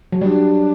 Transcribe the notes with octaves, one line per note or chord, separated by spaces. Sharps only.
F#3
G3 D4